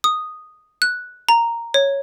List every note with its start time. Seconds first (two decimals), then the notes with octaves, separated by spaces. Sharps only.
0.04 D#6
0.82 F#6
1.29 A#5
1.74 C#5